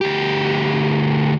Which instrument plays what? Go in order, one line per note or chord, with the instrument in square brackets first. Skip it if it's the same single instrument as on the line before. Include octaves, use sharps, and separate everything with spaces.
[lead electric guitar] D2 G4